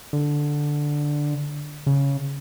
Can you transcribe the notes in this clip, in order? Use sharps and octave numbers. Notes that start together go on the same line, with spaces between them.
D3
C#3